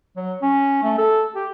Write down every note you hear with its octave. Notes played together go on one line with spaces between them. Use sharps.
F#3
C#4
A3
A4
G4